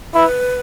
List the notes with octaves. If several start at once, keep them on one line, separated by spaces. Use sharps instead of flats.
E4 B4